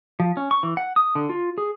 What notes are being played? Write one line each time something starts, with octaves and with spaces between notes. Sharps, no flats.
F3
C#4
C#6
E3
F#5
D#6
D3
F4
G#4